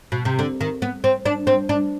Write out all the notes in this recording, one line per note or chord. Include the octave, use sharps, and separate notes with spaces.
B2
C3
D3
D#3
B3
C4
D4
C4
D4